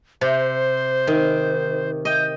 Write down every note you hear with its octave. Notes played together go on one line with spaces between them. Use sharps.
C3 C5
D#3
D#5 G5